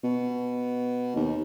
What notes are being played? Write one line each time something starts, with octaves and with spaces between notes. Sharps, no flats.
B2
D#2